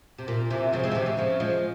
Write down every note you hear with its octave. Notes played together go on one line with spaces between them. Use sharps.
C3
A#2
C3 E3
C#3 F3
G#3 C4
F3
C3 E3
C#3
C#3 F3
F3 G#3